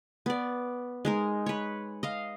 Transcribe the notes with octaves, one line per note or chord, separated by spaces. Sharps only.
B3 D5
G#3 D#4 A#4
B4 C#5
D#5 F5